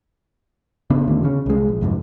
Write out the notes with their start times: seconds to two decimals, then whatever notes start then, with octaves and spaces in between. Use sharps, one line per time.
0.90 C#3 B3 D4
1.07 D#2 A2 D3
1.23 C#3 C#4
1.46 C2 G#3
1.69 A#1
1.81 C2 F2 G#2